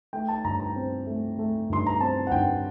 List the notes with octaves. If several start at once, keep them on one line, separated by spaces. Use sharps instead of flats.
A3 G5
A5
G2 A#5
A#5
C4
A3
A3
G2 C6
A#5
C4 A5
F#5
G2 G5